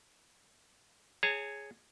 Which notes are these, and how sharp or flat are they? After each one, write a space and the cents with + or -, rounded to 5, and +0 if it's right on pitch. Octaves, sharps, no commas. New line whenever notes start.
G#4 +0 C#5 +0 A#5 -45